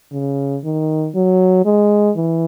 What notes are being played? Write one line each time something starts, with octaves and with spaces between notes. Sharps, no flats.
C#3
D#3
F#3
G#3
E3